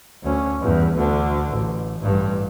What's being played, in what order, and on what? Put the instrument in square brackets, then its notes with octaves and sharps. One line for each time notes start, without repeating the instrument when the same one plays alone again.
[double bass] D2 C#4
E2 G2
D2 D3
A1
A1 G2